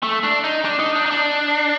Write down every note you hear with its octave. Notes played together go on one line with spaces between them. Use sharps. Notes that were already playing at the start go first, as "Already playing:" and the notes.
A3
D4
D#4
D4
D#4
D4
D#4
D4